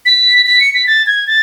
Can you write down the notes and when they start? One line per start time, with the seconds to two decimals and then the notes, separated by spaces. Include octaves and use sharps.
0.06 B6
0.46 B6
0.61 C#7
0.74 B6
0.87 A6
1.07 G#6
1.27 A6